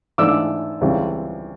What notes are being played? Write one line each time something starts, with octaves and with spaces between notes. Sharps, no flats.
G#2 E3 A3 D4 D6 E6
C#2 C#3 E3 G3 C4